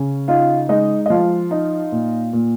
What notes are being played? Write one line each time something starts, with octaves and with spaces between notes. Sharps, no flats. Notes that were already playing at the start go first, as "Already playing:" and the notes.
Already playing: C#3 C#4
D#4 F4 F5
G#3 D#4 D#5
D#5
F3 F4 F5
D#4
A#2
A#2